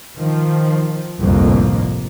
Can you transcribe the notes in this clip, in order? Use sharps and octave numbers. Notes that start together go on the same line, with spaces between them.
D#3 F3
G1 C2 F2 A2 D3 A#3